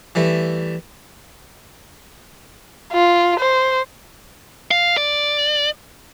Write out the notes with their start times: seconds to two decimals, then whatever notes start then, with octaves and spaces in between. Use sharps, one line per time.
0.15 E3 G3 A3
2.93 F4
3.39 C5
4.71 F5
4.97 D5